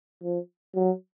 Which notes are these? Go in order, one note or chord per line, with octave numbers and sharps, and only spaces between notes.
F3
F#3